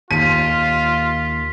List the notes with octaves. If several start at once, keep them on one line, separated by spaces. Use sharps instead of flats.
D#2 F4 B6 D#7